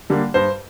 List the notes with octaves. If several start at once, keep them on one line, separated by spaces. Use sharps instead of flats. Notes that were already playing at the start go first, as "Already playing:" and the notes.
D3 G3 A#3
G2 C5